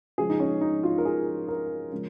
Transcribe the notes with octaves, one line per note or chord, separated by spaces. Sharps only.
C#3 F3 G#3 G#4
D#4
C#4
D#4
F4
A#4
G#4
A#4
C#3 F3 G#3